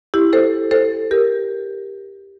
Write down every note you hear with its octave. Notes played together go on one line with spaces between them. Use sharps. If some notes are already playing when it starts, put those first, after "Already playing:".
E4 G4
A4 C5
A4 C5
G4 A#4